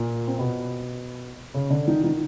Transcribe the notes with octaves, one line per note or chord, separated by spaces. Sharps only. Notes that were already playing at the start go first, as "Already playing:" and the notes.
Already playing: A#2 A#3
C4
B2 B3
C#3 C#4
D3 D4
D#3 D#4
D#3 D#4